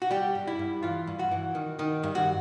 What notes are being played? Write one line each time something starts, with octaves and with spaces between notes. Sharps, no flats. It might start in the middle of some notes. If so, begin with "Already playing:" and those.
F#4
G3 G4
G2
E4
G2
E3 F4
G2
F#4
E3
D#3
D#3
G2
F#4